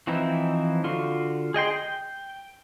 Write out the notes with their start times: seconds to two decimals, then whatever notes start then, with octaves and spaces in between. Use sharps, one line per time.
0.07 E3 F3 C4 D#4 E4
0.84 D3 F4 F#4
1.54 G#4 D#5 G5 C6
1.76 G5